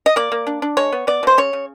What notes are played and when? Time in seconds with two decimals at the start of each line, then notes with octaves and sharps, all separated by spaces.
0.06 D#5
0.16 A#3 D5
0.32 A#3
0.47 D4
0.62 D4
0.77 G#3 C#5
0.92 B3
1.07 B3 D5
1.23 B2 C5
1.38 C#3 C#5
1.53 C#3